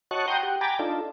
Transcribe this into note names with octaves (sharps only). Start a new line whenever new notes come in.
F#4 C#5 D#5 A5 C#6 F#6
F#5 G5 A#5 C6 D#6 G6
G4 F#5
G5 G#5 A#5 B5 D6 A6
D4 D#4 F4 A4